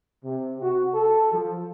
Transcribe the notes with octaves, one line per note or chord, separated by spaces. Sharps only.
C3
F#4
A4
F3